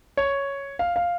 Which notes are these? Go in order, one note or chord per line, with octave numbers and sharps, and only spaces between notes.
C#5
F5
F5